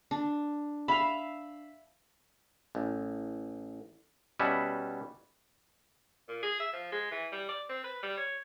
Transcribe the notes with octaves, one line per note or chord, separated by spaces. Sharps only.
D4
E5 F5 B5
A1
B2 G3 C#4 B4 E5
A#2
G#4
E5
F3
G#3
E3
G3
D5
C4
B4
G3
C#5